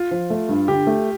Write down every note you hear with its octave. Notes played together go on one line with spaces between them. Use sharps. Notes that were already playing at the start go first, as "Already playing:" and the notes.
Already playing: F4
F3
A3
G2
D3 G4
A3